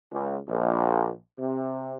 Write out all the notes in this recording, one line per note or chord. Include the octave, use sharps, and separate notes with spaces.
C#2
A#1
C3